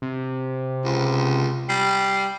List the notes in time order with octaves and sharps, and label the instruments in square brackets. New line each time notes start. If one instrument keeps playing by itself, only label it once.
[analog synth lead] C3
[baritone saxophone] C#2
[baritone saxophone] G3 [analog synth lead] C7